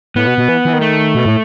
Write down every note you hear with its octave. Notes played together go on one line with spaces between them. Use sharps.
A2 B3
B2
B2
E3
E3
D#3
A3
B2
A2